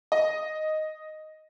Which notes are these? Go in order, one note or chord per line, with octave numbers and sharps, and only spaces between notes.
D#5